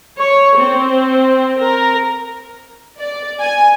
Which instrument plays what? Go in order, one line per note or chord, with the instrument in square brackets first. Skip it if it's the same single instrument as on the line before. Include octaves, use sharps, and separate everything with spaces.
[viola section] C#5
C4
A#4
[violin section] D5
G#5